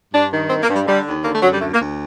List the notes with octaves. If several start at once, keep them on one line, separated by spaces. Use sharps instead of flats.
G2 D4
D#3
G2 C4
A#3
G2
G3
D3 G3
D#2
D3 A#3
A3
F#2 F#3
G3
D2 A3
A#3
D2